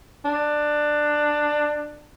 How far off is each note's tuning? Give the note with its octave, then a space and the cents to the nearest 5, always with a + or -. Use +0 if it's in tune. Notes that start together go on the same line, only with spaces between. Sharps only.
D4 +15